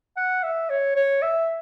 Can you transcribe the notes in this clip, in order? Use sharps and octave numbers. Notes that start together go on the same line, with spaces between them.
F#5
E5
C#5
C#5
E5